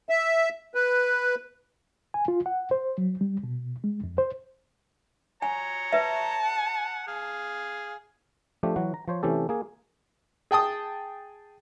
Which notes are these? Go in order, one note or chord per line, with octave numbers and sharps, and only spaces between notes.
E5
B4
G#5
F4
F#5
C5
F#3
G3
B2
G#3
F2
C5
C#5 G#5 A#5
B4 E5 A5
F#5
G#4 F5
F3 A3 D4 G4
E3 F#3 F#4
A#5
F3 C5 C#5
C3 E3 A3 C#4 G4 A4
A#3 G#4
G#4 G5 A5 D#6